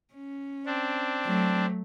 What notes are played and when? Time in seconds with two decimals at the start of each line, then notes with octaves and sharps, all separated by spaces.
0.14 C#4
0.66 C4 D4
1.25 F#3 A3